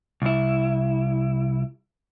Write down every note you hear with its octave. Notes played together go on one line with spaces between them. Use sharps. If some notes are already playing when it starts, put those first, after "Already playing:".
C2 E4